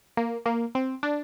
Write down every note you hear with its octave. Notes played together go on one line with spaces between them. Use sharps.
A#3
A#3
C4
D4